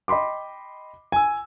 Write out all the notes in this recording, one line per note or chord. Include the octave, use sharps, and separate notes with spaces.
D#5 G5 B5 C6 D6
G#5 E6